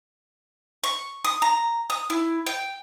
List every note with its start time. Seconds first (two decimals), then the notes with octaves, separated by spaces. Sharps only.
0.84 C#6
1.24 D#6
1.42 A#5
1.90 D#6
2.10 E4
2.47 G5